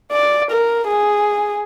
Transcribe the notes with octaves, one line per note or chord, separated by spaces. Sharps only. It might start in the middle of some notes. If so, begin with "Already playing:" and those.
D5
A#4
G#4